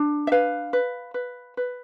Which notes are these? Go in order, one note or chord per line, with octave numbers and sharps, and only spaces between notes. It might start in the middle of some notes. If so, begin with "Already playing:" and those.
Already playing: D4
E5
B4 F5
B4
B4
B4